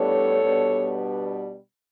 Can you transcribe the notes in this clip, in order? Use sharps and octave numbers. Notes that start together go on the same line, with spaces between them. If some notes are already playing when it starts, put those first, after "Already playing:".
Already playing: A2 G3 B3 D4 A4 C#5
B2 G3 B3 D4